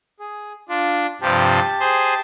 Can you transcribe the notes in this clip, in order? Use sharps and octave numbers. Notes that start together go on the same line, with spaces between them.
G#4
D4 F4
G2 C3 F3 G4 A5
G#4 C5